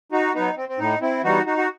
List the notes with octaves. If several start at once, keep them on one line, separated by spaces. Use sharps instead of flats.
D#4 F#4
F#3 B3 D#4
C4
C4
A2 D#4
C4 E4
E3 G3 B3 D#4 F#4
D#4 F#4
F#4